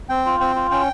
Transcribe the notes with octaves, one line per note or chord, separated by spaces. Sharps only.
C4 G5
F4
C4 G5
F4
C#4 G5